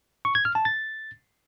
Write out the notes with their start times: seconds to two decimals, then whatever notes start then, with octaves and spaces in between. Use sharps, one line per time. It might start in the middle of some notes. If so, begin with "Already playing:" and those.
0.25 C#6
0.35 G#6
0.45 F6
0.55 A5
0.65 A6